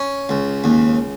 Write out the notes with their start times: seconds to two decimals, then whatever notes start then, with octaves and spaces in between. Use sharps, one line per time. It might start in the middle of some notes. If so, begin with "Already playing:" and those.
Already playing: C#4
0.29 C#2
0.64 D#2